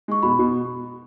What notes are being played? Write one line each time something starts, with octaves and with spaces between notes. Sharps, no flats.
G#3 C#6
B2 B5
B2